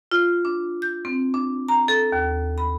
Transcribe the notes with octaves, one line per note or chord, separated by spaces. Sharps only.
F4
D4
G6
C4
D4
A#5
A4
D#2
B5